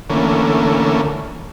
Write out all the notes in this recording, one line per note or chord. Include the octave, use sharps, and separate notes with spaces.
D3 E3 A3 A#3 C#4